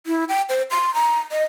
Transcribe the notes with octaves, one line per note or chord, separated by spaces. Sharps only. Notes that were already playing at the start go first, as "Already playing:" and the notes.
E4
G5
C5
C6
A#5
D#5